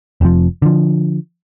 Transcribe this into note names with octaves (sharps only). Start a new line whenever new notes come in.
F1 F2 B2 F3
D3 F3